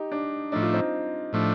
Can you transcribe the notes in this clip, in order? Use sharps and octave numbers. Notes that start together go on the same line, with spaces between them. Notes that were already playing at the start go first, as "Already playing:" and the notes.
Already playing: D#4 G4
D4
A2 F3 A3 D4 D#4
F4
C4 D#4
A2 F3 A3 D4